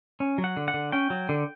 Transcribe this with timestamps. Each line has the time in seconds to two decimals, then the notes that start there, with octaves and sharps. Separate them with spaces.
0.20 C#4
0.38 F#3
0.44 F#5
0.57 D3
0.68 F#5
0.74 D3
0.92 C#4 G5
1.10 F#3
1.29 D3